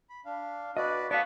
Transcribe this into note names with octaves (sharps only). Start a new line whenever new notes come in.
B5
D4 F5
F#4 B4 D5 D#5
B3 D5 F5 A5 C#6